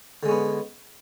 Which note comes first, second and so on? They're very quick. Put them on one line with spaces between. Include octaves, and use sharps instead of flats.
D3 G#3 C#4 B3